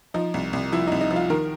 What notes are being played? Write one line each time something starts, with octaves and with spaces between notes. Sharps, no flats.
F3 D#4
C2
C2
F3 E4
C2 D#4
D#4
F3
F4
D#3 A#4